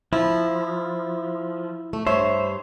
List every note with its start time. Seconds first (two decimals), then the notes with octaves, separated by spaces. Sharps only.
0.13 F3 E4
1.93 A3
2.07 G2 C5 C#5 E5